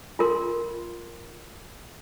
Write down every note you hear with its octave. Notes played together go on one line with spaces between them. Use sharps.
F4 A#4 C6